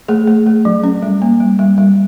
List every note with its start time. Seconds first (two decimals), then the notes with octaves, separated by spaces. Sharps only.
0.08 A3 G#4
0.27 A3
0.46 A3
0.65 F#3
0.84 C#4
1.02 G3
1.22 A#3
1.40 G3
1.59 G3
1.78 G3